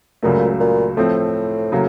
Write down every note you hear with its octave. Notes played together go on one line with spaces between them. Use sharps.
C#2 A#2 C#3 F#3 A3
A#2
A2 F3 A3 C4
C#3 F#3 A#3